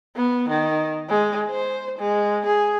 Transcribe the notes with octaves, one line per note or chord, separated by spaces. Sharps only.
B3
D#3
G#3
C5
G#3
G#4